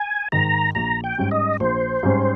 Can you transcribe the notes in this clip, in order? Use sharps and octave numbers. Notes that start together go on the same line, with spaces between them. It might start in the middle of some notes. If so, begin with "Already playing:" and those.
Already playing: G#5
G#2 D#3 A#5
A#1 A#5
G5
G#2 G3 C#4
D#5
A#1 C5
G#2 G3 C#4